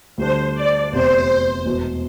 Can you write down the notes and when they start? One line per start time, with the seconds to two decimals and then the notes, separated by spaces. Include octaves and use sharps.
0.18 D2 D3 G3 D4 C5
0.55 D5
0.92 F1 E2 C3 C5
1.65 E1 E2 B2